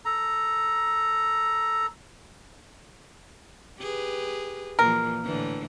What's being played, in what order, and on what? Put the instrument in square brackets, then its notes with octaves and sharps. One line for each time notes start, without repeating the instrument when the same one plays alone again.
[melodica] A4 A#5
[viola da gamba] G4 G#4 B4
[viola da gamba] A#2 E3 F3 [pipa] A#4
[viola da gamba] A2 D3 E3